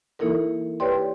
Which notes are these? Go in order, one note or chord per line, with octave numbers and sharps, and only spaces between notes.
E3 A#3 D#4 E4 A4 A#4
G4 B4 C#5 D5 G5 C6